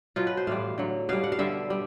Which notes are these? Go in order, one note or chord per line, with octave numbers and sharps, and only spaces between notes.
B2 F#3 F4
B4
C5
A2 E3 G3 F5
D3 F#3
B2 G3 F5
F#5
F5
D3 G3 E5
G3